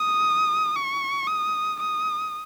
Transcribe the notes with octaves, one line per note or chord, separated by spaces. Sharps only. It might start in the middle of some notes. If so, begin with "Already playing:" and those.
Already playing: D#6
C#6
D#6
D#6